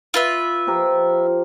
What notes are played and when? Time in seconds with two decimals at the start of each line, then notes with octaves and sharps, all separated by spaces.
0.14 F4 B4 E5
0.67 F3 G4 A#4